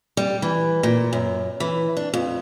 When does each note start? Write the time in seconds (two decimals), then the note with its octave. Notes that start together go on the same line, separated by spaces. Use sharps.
0.17 G3
0.42 E3
0.83 A#2
1.13 F#2
1.60 E3
1.97 D4
2.14 F2